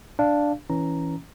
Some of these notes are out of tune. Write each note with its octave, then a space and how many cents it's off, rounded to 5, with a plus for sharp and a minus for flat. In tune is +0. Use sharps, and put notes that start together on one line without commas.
D4 +0 F5 -5
E3 -10 C#4 +0 A#5 +0